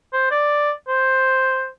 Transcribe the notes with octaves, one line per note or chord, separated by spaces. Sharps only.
C5
D5
C5